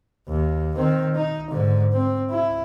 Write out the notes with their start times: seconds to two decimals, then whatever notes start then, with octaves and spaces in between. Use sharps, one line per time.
0.28 D#2
0.76 D#3 C4
1.15 D#4
1.50 G#2 D3
1.93 C4
2.30 E4